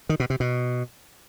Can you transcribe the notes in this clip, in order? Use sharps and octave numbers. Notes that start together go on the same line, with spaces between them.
D#3
B2
C3
B2